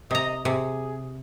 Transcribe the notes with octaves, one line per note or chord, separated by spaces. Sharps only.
C3 D#5 A#5
C3 G#4